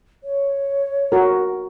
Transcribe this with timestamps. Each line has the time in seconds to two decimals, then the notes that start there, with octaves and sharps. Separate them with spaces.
0.24 C#5
1.12 F#4 A#4